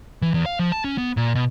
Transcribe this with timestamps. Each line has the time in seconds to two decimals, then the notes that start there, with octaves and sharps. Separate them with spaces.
0.22 E3
0.34 E2
0.46 F5
0.59 F3
0.72 A5
0.84 C#4
0.98 B3
1.17 A#2
1.35 B2